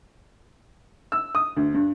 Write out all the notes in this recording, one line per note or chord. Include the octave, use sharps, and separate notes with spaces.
E6
D#6
D2
G2